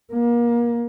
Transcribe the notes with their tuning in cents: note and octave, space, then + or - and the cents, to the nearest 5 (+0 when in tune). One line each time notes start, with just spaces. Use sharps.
A#3 +30